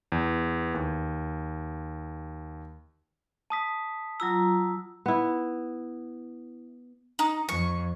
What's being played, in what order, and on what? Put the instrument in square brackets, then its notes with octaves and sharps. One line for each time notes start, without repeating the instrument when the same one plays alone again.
[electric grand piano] E2
D#2
[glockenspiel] A5 D#6 B6
[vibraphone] F#3 F4 A#5 [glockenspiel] E6
[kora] B3 E4
[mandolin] D#4
[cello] F2 [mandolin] C#6